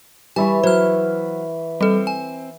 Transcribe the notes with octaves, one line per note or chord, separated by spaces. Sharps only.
E3 G3 E4 G#5 C#6
F#3 C5 F6
G3 C4 A4
G#5